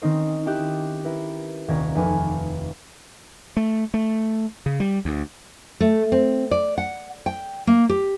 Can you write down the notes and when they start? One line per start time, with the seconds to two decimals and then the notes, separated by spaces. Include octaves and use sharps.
0.02 D#3 C4 C#4 D#4 A#4 C5
0.46 D#4 E4 G4 F#6 G6 E7
1.04 E4 A#4 B4
1.68 D#1 C2 A#4 C#6 G#6 B6
1.95 F1 D#2 B4 G#5 C#6 D6
3.57 A3
3.94 A3
4.66 C#3
4.80 G3
5.05 D2
5.80 A3
6.12 C4
6.51 D5
6.78 F#5
7.26 G5
7.67 A#3
7.89 G4